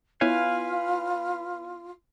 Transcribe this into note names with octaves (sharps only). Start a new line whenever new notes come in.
B3 E4 F4 B4 C#5 F5 G#5